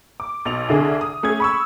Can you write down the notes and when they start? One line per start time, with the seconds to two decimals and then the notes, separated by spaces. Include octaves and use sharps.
0.20 D6
0.45 B1 F7
0.69 C2 D3 G#4
1.01 D#6
1.23 A3 C#4 G#4 G#6
1.40 B5 C#6 E6